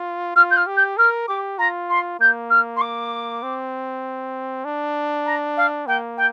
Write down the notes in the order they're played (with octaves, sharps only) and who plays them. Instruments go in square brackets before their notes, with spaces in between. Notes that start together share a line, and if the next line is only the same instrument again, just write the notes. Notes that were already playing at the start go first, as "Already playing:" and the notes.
Already playing: [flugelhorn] F4
[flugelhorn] F4 [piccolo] F6
[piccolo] G6
F6
[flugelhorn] G4
[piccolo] G6
[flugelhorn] A#4 [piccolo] F6
[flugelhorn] G4 [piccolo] D6
[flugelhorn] F4 [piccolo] A#5
[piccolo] C6
[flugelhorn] A#3 [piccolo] G6
[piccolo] F6
C6
D6
[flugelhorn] C4
D4
[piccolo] A#5
F5
[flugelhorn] A#3 [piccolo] G5
[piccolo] G5